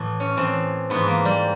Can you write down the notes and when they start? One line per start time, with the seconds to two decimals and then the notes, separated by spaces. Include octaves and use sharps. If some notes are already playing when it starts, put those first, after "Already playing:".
Already playing: A2 E3
0.20 C#4
0.37 A2 E3 C4
0.90 G#2 E3 B3
1.08 A#3
1.25 G3